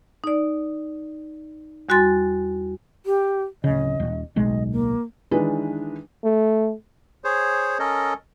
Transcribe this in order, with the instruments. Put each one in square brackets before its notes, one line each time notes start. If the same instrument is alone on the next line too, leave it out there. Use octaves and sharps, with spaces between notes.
[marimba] D#4 D5
E2 G3 F#4 G#5 C6 A6
[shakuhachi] G4
[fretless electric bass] D1 C#3 [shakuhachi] D#5
[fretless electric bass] D#1
[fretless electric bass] D1 B1 G#3 [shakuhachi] D#5
[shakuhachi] A#3
[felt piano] D#3 E3 G#3 D4 B4
[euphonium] A3
[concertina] G#4 C5 C#5
C#4 A4 A#4 D#5